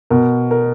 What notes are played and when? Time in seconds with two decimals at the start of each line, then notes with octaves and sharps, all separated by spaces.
0.10 B2 A#4
0.51 A#4